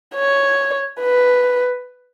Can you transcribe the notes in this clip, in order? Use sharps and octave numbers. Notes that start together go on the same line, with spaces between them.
C#5
B4